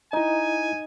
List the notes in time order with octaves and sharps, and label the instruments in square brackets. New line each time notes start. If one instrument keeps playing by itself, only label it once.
[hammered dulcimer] D#4 [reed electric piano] E4 D#5 [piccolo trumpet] G#5